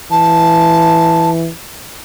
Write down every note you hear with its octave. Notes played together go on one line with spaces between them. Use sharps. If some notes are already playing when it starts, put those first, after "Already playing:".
E3 A5